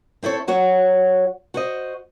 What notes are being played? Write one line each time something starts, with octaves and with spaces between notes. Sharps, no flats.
C4 E4 A4 C#5
F#3 F#4 C#5 F#5
F#4 C5 D#5